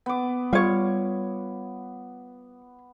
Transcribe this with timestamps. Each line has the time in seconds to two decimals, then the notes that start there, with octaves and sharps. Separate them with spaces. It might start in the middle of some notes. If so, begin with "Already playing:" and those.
0.06 B3 D6
0.53 G3 F4 C#5